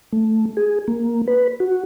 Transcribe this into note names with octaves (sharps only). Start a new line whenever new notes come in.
A3
G#4
A#3
B4
F#4